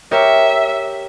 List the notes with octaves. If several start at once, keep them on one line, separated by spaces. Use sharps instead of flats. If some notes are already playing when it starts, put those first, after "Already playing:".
G4 A#4 C#5 E5